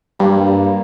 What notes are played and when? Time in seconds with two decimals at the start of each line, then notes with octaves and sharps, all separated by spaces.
0.19 G2 A#3
0.47 G3
0.64 A#3